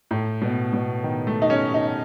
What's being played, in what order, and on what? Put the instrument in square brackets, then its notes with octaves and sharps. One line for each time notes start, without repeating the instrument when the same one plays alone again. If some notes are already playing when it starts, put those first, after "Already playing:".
[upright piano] A2
B2
B2
D#3
A3
D#4
C#4
D#4